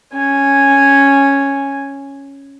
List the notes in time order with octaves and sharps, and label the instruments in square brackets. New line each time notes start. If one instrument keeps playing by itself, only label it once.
[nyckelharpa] C#4 G#5